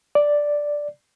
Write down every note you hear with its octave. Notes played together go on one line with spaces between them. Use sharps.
D5